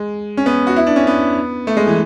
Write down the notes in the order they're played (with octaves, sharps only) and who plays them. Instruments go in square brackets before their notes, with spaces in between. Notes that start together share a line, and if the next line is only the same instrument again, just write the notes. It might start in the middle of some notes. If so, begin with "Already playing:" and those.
Already playing: [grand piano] G#3
C#4
B3
F#4
E4
D4
C#4
B3
A3
G#3
E3